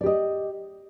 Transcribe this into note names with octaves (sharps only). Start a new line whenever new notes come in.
G4 D5 D#5